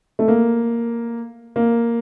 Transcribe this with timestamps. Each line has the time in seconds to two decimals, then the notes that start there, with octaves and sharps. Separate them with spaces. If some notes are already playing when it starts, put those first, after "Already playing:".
0.19 A3
0.28 A#3
1.56 A#3